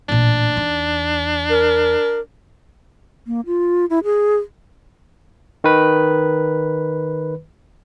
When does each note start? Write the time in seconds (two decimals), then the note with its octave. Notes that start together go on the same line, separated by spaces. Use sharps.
0.09 A1 A#2 D4
0.57 E2 D#4
1.50 A#4
3.27 A#3
3.46 F4
3.90 E4
4.04 G#4
5.64 D#3 B4